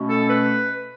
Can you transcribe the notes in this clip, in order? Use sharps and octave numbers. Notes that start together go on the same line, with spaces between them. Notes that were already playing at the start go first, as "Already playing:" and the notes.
Already playing: B2 A3 C#4
A4
B4